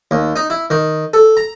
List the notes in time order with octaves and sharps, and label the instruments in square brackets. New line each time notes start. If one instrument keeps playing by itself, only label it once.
[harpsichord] D#2
D#4
E4
D#3
A4
A#5